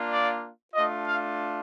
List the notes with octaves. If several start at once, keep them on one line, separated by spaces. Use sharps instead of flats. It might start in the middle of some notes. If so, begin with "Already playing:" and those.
Already playing: A#3 D4 F4
D5
A3 D4 F4 D#5
F5